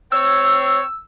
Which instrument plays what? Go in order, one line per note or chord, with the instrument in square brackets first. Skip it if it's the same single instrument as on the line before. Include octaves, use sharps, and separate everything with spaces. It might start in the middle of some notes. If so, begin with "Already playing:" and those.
[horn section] C4 C#5 [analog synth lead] E6